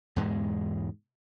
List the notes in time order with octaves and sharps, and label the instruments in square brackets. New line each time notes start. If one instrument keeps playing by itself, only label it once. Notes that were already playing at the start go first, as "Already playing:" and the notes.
[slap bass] E2 G#2 B2 G#3